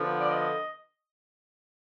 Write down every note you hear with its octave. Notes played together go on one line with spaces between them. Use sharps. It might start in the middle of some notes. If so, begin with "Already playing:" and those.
Already playing: D3 F3 B3
D5
D#5